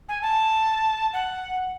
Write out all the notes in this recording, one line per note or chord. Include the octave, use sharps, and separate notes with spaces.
G#5
A5
F#5